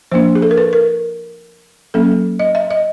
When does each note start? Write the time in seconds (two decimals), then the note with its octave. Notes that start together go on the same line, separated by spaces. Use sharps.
0.12 F3 A#3 D4 C5
0.35 G#4
0.42 A4
0.51 A#4
0.58 B4
0.73 A#4
1.94 F#3 A#3 C#4 A4
2.39 D#5
2.55 E5
2.71 D#5